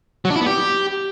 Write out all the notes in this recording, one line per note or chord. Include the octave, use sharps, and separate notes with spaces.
F#3
D4
E4
B3
G4